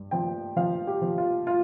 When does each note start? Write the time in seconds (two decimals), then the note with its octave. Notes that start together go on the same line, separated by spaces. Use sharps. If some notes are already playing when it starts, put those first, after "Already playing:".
Already playing: G2
0.11 F3 G5
0.57 F3 F5
0.87 G4
1.02 F3
1.18 F4
1.47 F4